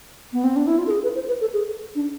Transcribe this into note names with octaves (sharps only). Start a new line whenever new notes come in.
B3
C4
D4
E4
F4
A4
G#4
B4
C5
B4
A4
G#4
D4